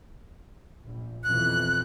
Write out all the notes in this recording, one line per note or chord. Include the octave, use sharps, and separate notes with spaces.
A#1
F2 B2 E3 F#6